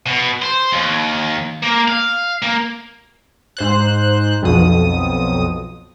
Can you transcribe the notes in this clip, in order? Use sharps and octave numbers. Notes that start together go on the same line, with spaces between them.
B2
C5
D#2
A#3
F5
A#3
G#2 C5 F#6
B1 F2 B2 D#6